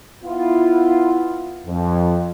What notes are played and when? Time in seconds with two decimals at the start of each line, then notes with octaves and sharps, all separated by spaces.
0.24 B3 E4 F4
1.66 F2